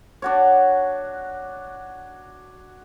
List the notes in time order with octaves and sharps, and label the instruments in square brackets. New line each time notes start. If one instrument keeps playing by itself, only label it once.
[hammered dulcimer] D4 F#4 C#5